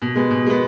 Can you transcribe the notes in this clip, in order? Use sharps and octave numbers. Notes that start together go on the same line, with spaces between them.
B2
G#3 B3
B2
G#3 B3